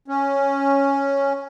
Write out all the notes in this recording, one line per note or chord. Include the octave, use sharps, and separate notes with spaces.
C#4